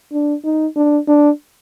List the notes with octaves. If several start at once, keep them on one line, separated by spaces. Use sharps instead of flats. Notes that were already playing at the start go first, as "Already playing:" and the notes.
D4
D#4
D4
D4